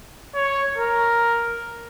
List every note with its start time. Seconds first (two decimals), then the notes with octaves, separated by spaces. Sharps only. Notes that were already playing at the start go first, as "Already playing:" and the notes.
0.35 C#5
0.78 A#4